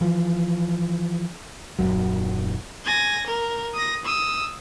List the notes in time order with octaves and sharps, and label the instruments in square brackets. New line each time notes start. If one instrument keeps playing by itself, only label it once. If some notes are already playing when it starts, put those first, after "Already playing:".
[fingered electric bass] E3 F3
D#1 G#1 F#2 F#3
[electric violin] G#5 A#6
A#4
D#6 A#6
D#6 E6